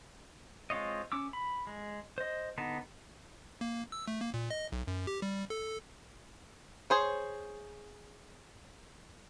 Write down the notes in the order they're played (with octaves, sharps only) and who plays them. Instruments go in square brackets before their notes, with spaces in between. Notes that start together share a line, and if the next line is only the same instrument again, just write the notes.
[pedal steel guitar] G#3 C4 F4 C#5 D#5
C#4 D6 E6
B5
G#3
C5 D#5
D3 B3 D#4 A5
[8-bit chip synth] A#3
E6
A3
A#3
A#2
D#5
B1
F#2
G4
G3
A4
[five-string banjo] G#4 C5 C#5